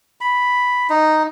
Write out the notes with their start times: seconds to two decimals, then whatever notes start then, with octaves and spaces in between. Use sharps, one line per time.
0.21 B5
0.90 D#4